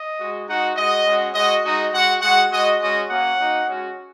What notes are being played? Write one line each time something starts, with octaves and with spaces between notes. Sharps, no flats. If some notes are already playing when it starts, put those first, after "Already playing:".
Already playing: D#5
G#3 F#4
G#3 D#4 F#4 F#5
G#3 F#4 D#5
G#3 C#4 F#4
G#3 F#4 D#5
G#3 D#4 F#4 D#5
G#3 F#4 F#5
G#3 F#4 F#5
G#3 F#4 D#5
G#3 C#4 F#4 D#5
A#3 C#4 F#4 F#5
A#3 D#4 F#4
G#3 C#4 F#4